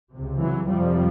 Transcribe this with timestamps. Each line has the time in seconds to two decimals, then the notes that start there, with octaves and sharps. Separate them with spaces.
0.13 C#2 C3
0.42 E3 F#3
0.70 F2 C3 F3 G3